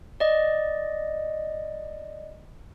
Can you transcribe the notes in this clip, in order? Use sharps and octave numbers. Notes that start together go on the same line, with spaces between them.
D5 D#5